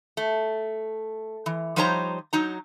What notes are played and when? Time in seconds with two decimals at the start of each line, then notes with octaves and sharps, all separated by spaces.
0.17 A3
1.46 E3
1.76 F3 G3 D#4 C5 C#5 A#5
2.33 F#3 D#4 A#5